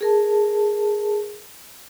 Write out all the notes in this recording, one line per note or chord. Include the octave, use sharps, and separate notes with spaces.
G#4 A#4 A5